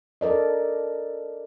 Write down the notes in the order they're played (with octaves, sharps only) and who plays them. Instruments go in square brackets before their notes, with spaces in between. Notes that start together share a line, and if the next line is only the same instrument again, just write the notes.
[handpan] A4 A#4 D5 D#5